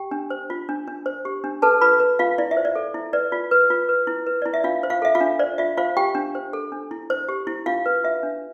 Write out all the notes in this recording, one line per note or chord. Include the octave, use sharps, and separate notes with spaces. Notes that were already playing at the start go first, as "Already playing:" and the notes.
Already playing: G4 G5
D4
C5
F4
D4
D4
C5
G4
D4
A4 B4 A5
F4 B4 B5
B4
F4 F5
E4 D5
E5
C5
D5
A4
E4
B4 D5
F4
B4
F4
B4
E4
B4
E4 D5
E5
D4 F4 F5
C5
F4 F5
A4 E5
F4 F5
D4
C5 D5
F4 E5
F4 C5 F5
F4 G4 G5
D4
C5
A4
D4
E4
C5
G4
E4
D4 F4 F5
B4
F4 E5
D4